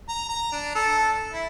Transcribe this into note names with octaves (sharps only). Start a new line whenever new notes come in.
A#5
A#5
D4
A4
E4